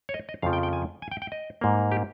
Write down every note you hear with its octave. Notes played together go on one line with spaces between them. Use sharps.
C#5
D#5
D#5
F2 C#3 F3 F5
G5
G5
G#5
G#5
G5
G5
D#5
G#2 G3 A#3
G4